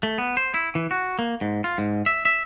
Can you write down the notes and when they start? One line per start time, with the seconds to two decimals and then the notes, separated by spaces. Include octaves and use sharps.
0.03 A3
0.18 B3
0.37 C5
0.54 E4
0.75 E3
0.91 F#4
1.19 A#3
1.41 G#2
1.64 F4
1.78 G#2
2.06 E5
2.25 E5